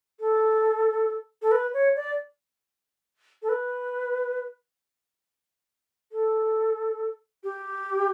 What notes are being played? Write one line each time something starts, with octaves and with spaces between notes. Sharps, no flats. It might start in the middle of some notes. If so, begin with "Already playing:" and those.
A4
A4
B4
C#5
D5
A4
B4
A4
G4